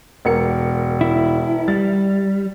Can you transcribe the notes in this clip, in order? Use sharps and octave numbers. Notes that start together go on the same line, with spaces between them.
E1 A#4 C#7
E4
G3 A6